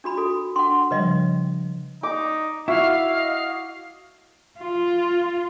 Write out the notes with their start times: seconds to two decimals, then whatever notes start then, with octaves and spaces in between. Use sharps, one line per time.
0.04 D4 F#4 B5
0.17 F#4 A4
0.56 D4 F#5 G5 C6
0.91 C#3 F3 G3 B4 D#5
2.03 D#4 D6
2.68 E4 F#4 E5 F5
3.15 D#5
4.60 F4